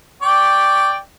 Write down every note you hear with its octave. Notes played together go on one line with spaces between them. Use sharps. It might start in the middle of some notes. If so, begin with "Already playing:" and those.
D5 G5 C#6